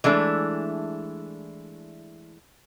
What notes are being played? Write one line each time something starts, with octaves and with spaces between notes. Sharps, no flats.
E3 G#3 A3 D4